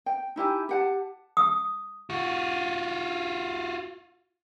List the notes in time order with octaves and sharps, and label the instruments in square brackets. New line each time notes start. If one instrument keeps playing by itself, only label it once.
[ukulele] G5
D#4 E4 G4 G#5
G4 F#5 A5
[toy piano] D#6
[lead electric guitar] F4 F#4